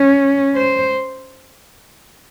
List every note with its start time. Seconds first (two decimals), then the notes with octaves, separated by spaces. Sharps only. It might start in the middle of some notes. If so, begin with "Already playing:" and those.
Already playing: C#4
0.56 C5